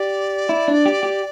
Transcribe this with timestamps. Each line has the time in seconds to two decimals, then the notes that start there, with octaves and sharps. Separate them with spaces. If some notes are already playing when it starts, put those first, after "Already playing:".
Already playing: G4 D5
0.49 E4
0.68 D4
0.86 G4
1.03 G4